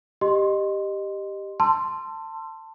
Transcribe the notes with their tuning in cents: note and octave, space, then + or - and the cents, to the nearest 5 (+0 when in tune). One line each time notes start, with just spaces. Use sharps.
G4 +0 D#5 -20 C6 +0
A5 +20 C6 +0 E6 +35